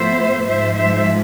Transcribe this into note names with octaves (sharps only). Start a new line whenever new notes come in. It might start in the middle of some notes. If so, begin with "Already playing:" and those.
Already playing: A2 F3 B3 C5 E5
G#2 F3 G#3 C5 E5
C5 E5